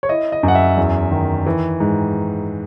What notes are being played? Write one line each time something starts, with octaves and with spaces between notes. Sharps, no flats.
C#5
E4 D#5
D#5
F#2
F#5
E5
E2
D#3
E3
G#2